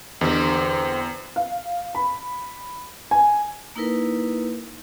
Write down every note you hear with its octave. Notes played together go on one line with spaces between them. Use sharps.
E2 D3 C4 G4
F5
B5
G#5
A#3 D#4 E4 A#4 B4